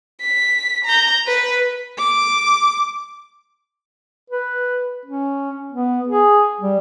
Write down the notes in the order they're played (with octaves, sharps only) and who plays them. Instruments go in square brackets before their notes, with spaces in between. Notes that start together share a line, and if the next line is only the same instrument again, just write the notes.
[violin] B6
A#5 G6
B4
[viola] D6
[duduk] B4
C#4
B3
G#4
G3